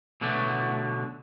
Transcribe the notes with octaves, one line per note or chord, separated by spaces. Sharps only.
B2 D3 F#3 A3